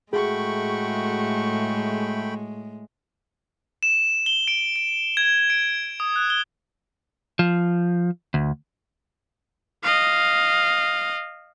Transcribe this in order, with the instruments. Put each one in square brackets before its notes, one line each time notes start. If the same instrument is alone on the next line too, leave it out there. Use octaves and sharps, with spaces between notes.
[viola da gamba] A2 G#3 [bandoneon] A3 G5 B5 [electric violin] F#4 C#6 [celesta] G#4
[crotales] E7
G7
D7
D7
G#6
D7
D#6
F#6
G7
[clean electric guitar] F3
D2
[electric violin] D#5 F5